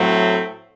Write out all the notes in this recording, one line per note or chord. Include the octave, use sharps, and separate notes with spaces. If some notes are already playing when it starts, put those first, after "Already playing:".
Already playing: A2 F#3 A3 C4